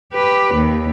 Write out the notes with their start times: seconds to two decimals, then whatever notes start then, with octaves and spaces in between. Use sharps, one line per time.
0.14 G4 B4
0.55 D#2